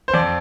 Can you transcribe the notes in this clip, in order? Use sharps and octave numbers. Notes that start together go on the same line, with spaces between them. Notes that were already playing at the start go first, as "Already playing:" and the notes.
C5
F2 D5